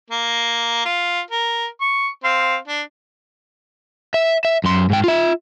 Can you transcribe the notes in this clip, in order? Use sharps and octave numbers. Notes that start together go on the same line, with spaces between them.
A#3
F4
A#4
C#6
C4 F5 C6
D4
E5
E5
F#2 C6
G#2 G5
F4 E5